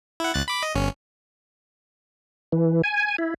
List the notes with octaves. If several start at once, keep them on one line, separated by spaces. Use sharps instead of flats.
E4 F#5
C#2 F#6 A6
B5 D6
D#5
G1 C#4
E3
G#5
E4